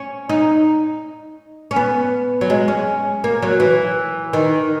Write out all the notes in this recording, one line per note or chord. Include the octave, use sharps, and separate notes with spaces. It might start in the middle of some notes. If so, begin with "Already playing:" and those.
Already playing: C#4
D#4
C#4
B3
F#3
G#3
C#4
A#3
F#3
E3
D#3